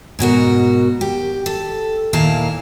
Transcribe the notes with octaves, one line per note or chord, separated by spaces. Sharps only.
G#2 B2 F#4 A#4
G4
A4
D#2 A#2 A#3 E4 F5 A5